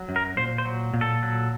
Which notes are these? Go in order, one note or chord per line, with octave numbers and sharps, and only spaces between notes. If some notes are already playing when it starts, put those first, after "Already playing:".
Already playing: F#3
F#2
A#4
A#2 C5
C5
F#3
A#2
A4
F#3